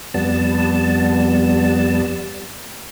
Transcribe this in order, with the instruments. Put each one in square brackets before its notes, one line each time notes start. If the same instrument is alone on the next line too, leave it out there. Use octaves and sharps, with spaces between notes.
[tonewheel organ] F2 G3 B3 A5